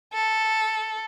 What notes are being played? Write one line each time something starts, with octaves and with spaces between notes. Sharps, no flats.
A4